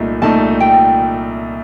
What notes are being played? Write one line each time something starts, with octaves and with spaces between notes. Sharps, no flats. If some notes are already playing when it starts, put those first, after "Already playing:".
Already playing: C2 A#2 A3 D#4
C2 A#2 A3 D#4 A5
G5